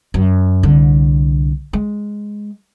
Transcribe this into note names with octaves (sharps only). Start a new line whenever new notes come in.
F#2
C2 D3
G#3